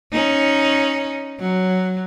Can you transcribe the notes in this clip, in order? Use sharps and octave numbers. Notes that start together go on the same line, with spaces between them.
C#4 D#4
F#3